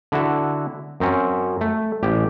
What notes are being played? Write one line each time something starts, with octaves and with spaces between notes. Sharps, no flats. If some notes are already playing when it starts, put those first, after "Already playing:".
D3 E4 F#4 A4
F#2 C4 C#4
A3
A1 G4